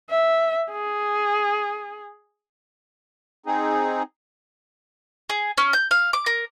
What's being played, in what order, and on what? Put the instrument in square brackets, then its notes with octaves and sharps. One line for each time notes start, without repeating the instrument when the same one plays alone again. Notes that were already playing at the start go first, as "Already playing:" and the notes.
[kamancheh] E5
G#4
[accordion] C4 D#4 G#4
[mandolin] G#4
C#4
G6
F5
D6
A#4